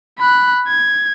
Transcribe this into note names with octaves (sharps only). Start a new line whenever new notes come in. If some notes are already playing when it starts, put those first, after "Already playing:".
B5 F#6
G#6